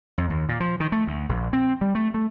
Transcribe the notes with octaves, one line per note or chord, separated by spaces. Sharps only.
F2
D#2
A#2
F3
D#3
A3
D2
A#1
C4
G3
A3
A3